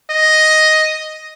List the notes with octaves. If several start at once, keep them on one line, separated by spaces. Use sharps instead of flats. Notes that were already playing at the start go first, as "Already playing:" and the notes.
D#5